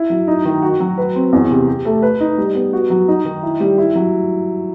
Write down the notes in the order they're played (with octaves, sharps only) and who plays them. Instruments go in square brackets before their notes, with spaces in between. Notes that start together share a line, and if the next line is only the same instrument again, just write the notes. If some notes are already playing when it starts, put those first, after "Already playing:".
Already playing: [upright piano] E4
F#3
D#4
D#3
F#4
F#3
B4
C4
E2
C3
G4
A3
B4
D#4
G3
B3
F#4
F#3
D#4
D#3
E4
G3
E4
F#3